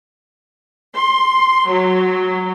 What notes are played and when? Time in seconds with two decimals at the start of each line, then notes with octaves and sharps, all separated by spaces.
0.94 C6
1.68 F#3